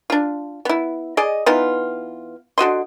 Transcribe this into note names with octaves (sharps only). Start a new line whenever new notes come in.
D4 F4
B3 E4
G#4 D5 D#5
E3 B3 D#4 F4
D3 F#4 D#5 C6